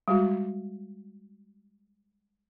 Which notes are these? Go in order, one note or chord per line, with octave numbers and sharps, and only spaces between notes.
G3 G#3 F#4